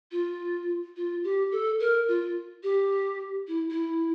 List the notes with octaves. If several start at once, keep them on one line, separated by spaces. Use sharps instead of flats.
F4
F4
G4
A4
A#4
F4
G4
E4
E4